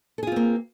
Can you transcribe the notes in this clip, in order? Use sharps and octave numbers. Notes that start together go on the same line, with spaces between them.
A#3 C4 F4 G#4 A4